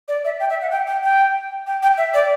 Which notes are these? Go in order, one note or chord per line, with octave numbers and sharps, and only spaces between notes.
D5
E5
G5
E5
F#5
G5
G5
G5
G5
G5
E5
D5